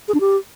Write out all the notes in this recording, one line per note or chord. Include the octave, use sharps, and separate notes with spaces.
G#4
D4
G4